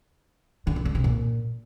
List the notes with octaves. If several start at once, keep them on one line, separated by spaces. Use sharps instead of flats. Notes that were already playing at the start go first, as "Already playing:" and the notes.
D3
D#3
D3
C3
A#2